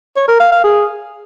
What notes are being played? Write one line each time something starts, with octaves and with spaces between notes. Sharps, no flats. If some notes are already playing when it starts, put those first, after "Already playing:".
C#5
A#4
F5
F5
G#4